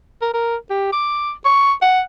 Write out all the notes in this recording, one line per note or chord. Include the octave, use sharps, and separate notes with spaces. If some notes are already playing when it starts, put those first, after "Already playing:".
A#4
A#4
G4
D6
C#6
F#5